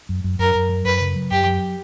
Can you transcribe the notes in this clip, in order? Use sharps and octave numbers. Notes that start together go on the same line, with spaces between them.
F#2
F#2
F#2 A#4
F#2
F#3
F#2 B4
C#3
F#3
F#2 G4
F#3